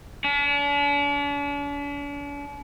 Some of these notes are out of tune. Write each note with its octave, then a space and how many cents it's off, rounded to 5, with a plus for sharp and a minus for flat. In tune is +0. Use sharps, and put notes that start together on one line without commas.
D4 -45